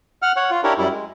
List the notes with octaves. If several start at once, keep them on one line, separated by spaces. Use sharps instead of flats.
F#5 F6
C#5 F#5
F4
D4 E4 G4 A#4 C#5
F#2 G3 E4
G#3